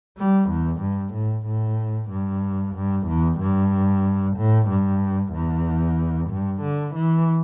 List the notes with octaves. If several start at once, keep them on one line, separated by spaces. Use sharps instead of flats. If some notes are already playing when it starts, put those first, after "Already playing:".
G3
E2
G2
A2
A2
G2
G2
E2
G2
A2
G2
E2
G2
D3
E3